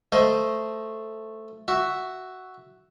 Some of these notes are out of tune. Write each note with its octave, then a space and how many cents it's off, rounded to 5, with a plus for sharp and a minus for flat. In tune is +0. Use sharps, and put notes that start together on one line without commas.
A3 +0 C5 -10 D#5 +10
F#4 +5 E5 +0